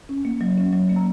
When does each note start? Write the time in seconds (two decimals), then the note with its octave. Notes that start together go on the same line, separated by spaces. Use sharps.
0.09 C#4
0.25 A#3
0.41 F#3
0.58 C#4
0.73 F#3
0.89 A#3
0.96 A#5